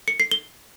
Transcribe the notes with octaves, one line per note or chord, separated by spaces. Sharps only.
C#7
C7
G7